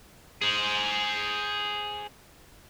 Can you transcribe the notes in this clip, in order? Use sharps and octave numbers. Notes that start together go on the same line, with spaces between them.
G#4 C5